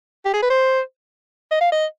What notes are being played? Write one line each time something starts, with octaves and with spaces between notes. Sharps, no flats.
G4
G#4
B4
C5
D#5
F5
D#5